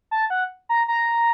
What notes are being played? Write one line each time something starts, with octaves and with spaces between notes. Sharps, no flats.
A5
F#5
A#5
A#5